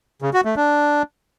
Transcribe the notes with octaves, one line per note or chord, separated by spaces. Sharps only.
C#3
F#4
A3
D4